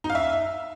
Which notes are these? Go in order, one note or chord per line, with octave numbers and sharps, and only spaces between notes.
D#4
F5
E5